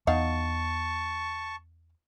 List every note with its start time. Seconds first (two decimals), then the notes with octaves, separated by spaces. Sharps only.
0.07 E2 B3 D#4 F5 F#5 A5 C#6